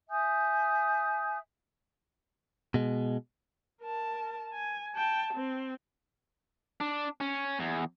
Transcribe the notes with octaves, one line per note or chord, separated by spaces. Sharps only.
E5 G#5 D#6 G6
B2 G#3
A#4 A5
G#5
G5 A5
C4
D4
C#4
E2